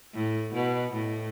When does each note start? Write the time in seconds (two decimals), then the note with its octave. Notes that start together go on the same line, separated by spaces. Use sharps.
0.14 A2
0.54 B2
0.93 A2